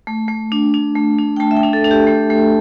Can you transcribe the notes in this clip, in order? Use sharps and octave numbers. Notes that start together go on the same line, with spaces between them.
A3
A3
D4
D4
A3
D4
G5
A3 A5
E5
G5
D4
A4
D4
G4
A3
A3